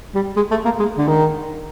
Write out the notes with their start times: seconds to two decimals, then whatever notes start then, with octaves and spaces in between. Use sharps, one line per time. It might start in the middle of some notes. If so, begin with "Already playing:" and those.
0.15 G3
0.37 G#3
0.51 A3
0.65 A#3
0.80 G#3
0.97 D3
1.08 D#3